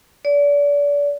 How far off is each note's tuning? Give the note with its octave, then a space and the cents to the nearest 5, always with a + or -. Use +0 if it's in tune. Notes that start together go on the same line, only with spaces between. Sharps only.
D5 -35